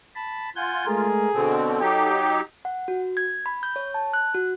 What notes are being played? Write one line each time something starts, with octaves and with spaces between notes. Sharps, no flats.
A5 B5
F4 F#5 G#5 G6
G#3 A3 G#4 A#4
B2 D3 C4 A4
F#3 D#4 G4 G5
F#5
F#4
G#6
B5
G6
C#5
A5
F#6
F#4